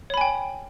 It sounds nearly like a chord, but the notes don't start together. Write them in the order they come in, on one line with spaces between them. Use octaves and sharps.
C#5 B5 G#5 G5